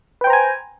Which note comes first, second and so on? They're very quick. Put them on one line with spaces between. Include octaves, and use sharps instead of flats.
B4 G5 C5 A#5 G#5